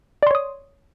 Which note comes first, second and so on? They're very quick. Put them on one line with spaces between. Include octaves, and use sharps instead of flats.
D5 C6 C#5 D#6